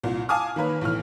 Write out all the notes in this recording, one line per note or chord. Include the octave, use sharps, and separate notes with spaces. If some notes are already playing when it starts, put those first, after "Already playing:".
C2 A#2
F5 G#5 A5 D6 D#6 F6
D#3 A#3 B4 C#5
B1 A2 E3 F6